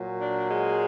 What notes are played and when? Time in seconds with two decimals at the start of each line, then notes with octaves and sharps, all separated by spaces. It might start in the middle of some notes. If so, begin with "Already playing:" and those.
Already playing: A#2 F#3
0.19 D4
0.48 G#3